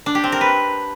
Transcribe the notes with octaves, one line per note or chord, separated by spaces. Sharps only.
D4
G4
C4
A#4
B4